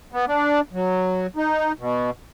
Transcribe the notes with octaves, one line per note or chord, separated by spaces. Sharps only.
B3
D4
F#3
D#4
B2